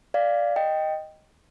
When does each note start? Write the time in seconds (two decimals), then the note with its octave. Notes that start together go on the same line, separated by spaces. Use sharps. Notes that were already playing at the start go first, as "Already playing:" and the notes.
0.14 D5 F5
0.56 D#5 G5